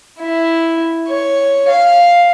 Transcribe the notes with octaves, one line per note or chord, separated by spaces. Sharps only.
E4
C#5
F5